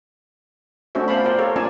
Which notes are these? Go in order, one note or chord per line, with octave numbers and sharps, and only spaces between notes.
A3 C#4 D4 F#4 C5 E5
B3 C5 F5 A5 B5
F4 A#4 C5 D5 G5
G4 A4 A#4 C#5 F5
A#3 C#4 F4 D5 G#5 A5